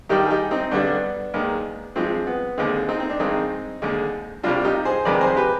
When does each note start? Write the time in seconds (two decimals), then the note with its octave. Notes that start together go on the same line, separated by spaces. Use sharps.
0.09 G2 D#3 G3 D#4 G4
0.26 G#4
0.31 D#4 G4
0.51 C4 D#4
0.71 G2 D3 G3 B3 D4
1.34 D#2 D#3 G#3
1.96 G2 F3 G#3 C4
2.27 B3
2.58 D#2 D3 G#3 C4
2.89 C4 D#4
3.00 C4
3.10 D4
3.20 G2 D#3 G#3 C4 D#4
3.82 D#2 D3 G#3
4.44 C2 C3 G3 D4 F4
4.64 D#4 G4
4.85 G#4 C5
5.05 F2 C3 D#3 G#3 B4 D5
5.21 G#4 C5
5.37 G4 B4